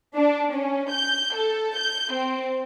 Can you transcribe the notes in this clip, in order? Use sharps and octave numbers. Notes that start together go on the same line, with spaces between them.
D4
C#4
G6
A4
G6
C4